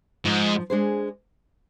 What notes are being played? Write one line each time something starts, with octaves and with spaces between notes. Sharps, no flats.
G#2 F3
G#3 D4 G#4 C5